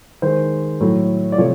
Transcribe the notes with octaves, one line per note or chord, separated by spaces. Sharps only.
D#3 G#3 C5
A2 F#3 A3
D5
C3 F3 A3 C#5